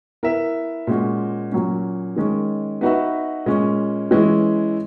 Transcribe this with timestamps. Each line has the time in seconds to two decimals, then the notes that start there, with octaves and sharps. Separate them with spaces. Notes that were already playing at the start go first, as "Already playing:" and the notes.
0.23 B3 E4 A#4 E5
0.87 A#2 G#3 C#4 F#4
1.52 A#2 F#3 C#4
2.16 D#3 G#3 C#4
2.81 B3 D#4 F#4 B4 E5
3.46 A#2 G#3 C#4
4.11 E3 G#3 C#4 E4